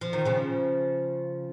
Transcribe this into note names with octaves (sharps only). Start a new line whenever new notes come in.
F3
D#3
C#3 F3